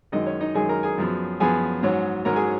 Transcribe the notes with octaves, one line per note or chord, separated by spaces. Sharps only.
F#2 D#3 G#3 D#4 D#5
C#4 C#5
D#4 D#5
F#2 D#3 G#3 G#4 G#5
A#4 A#5
G#4 G#5
F#2 F3 B3
F#2 F3 B3 G#4 G#5
G#2 F#3 C#4
G#2 F#3 C#4 A#4 A#5
G#4 G#5